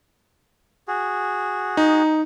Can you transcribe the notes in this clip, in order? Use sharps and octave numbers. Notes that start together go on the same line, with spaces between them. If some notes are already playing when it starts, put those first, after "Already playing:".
F#4 G#4
D#4